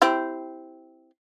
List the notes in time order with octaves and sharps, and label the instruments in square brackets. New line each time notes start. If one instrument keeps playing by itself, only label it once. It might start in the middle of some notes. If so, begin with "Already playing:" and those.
[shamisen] C4 E4 G4